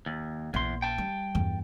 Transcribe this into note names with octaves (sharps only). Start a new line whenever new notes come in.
D#2
A#1 E2 C6
G5 A5
G3
E2 G2